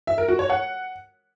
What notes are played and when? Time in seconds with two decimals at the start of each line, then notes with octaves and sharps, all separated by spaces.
0.07 E5
0.18 A#4
0.28 F#4
0.39 C#5
0.50 F#5